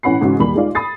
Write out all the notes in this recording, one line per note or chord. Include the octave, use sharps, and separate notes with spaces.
A1 E3 C#4 F#5 B5 C7
G#2 C#3 E3 C#4 F#4
D#2 G3 B5 F#7
G#3 D#4 F4 D5 F5
B5 D#6 A6 C7